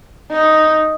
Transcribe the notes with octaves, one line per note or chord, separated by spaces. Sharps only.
D#4